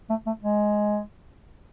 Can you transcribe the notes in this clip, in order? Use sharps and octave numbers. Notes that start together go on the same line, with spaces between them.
A3
A3
G#3